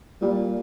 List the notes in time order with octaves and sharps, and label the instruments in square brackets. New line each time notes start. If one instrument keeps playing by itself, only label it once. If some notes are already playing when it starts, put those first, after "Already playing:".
[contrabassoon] A#2 [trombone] G3